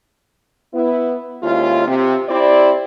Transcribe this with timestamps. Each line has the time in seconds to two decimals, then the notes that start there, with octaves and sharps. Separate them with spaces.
0.74 B3 E4
1.43 D#2 G#2 C#4 E4 F4
1.87 C3
2.29 C4 E4 G4 D5